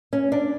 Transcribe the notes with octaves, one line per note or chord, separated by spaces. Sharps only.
C#4
D4